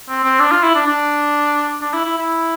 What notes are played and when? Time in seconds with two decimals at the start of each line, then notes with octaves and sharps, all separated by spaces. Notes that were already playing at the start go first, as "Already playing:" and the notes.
0.09 C4
0.24 C4
0.40 D4
0.51 F4
0.63 E4
0.75 D4
0.86 D4
1.82 D4
1.93 E4
2.05 E4
2.17 E4